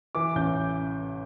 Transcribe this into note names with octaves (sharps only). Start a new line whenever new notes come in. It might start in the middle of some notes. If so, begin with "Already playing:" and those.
E3 D6
A1 G6